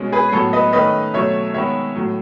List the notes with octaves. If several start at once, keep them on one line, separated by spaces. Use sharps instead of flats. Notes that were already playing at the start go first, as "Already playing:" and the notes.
Already playing: B2 G#3 C#4
G#4 B4
A2 F#3 B3 A4 C#5
B4 D#5
D#3 A3 C#4 B4 D#5
B2 F#3 A3 C#5 E5
D#3 G#3 B3 C#5 E5
A2 F#3 A3